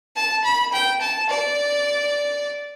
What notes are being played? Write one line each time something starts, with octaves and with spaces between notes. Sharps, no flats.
A5
B5
G5
A5
D5